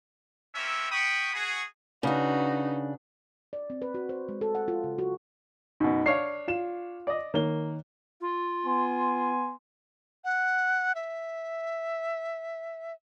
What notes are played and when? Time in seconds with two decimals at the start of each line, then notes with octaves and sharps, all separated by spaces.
0.55 A#3 C4 C#4 E5
0.91 F#4 G5 B5 C#6 D#6
1.34 F#4 G#4
2.03 C#3 D4 D#4 F#4 B4
3.53 D5
3.70 C4
3.82 B4
3.94 F#4
4.09 C5
4.29 G#3
4.41 A4
4.55 F#5
4.68 F4
4.84 C#3
4.98 F#4
5.80 F#2 B2 D#4
6.06 D4 C#5 F5 C7
6.48 F4 E7
7.07 D5 D#5
7.34 D#3 A#3 C#5 G7
8.21 F4
8.65 B3 G#5 C6
10.24 F#5
10.95 E5